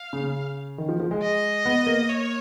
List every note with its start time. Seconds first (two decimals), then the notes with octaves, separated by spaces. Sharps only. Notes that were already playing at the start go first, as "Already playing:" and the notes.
Already playing: F5
0.13 C#3
0.24 C#3
0.78 D#3
0.89 F3
1.00 F3
1.11 G#3
1.22 D#5
1.65 B3
1.87 A#3
2.09 C#5